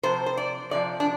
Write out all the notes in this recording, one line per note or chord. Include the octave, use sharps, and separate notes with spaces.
C3 F3 C5
C5
D5
C3 F3 D5
D4